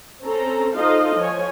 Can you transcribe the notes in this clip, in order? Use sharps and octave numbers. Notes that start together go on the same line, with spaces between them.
C4 C#4 A4 A#5
D#4 F4 A4 C5 D#5 F5
F3 C#5 G#5